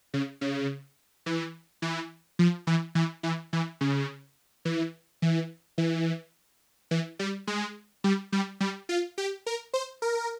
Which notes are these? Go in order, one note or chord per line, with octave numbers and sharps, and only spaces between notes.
C#3
C#3
E3
E3
F3
E3
E3
E3
E3
C#3
E3
E3
E3
E3
G3
G#3
G3
G3
G3
F4
G4
A#4
C5
A#4